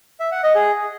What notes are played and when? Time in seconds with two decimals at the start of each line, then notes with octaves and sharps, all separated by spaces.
0.20 E5
0.32 F#5
0.43 D#5
0.55 G#4